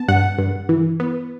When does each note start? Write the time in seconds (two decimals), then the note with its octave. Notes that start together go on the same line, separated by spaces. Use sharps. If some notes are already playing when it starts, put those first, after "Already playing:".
Already playing: B3 A5
0.08 G2 F#5
0.38 G2
0.69 E3
1.00 B3